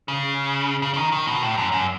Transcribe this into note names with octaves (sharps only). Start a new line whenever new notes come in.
C#3
C#3
C#3
D#3
D#3
B2
A2
F#2
F#2